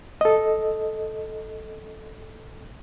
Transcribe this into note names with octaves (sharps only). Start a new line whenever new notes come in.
A4 D#5